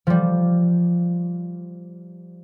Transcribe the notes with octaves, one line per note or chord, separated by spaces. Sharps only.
F3 G3